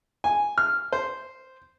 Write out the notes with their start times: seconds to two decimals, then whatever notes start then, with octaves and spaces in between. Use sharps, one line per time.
0.24 G#5
0.58 F6
0.92 C5